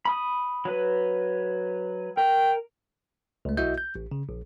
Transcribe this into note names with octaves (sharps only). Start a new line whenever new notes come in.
B5 D#6
F#3 B4
A#4 G5
C#2 A3
B1 E4 F#4 D#5 E5 G6
G6
A1
C#3
A#1